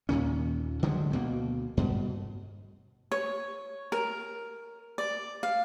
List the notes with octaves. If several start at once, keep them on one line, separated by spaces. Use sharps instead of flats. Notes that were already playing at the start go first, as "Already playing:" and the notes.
D#2 A#2 D#3 C#4
D3 F3 F#3 G#3
D2 B2 A#3
G2 B2
C#5
A#4
D5
F5